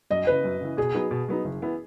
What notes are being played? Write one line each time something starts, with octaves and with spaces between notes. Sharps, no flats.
F#2 D#5
C#3 E3 B4
F#2
C#3 E3
B2 G#4
F#3 B3 D#4
B2
F#3 B3 D#4
F#1
E3 B3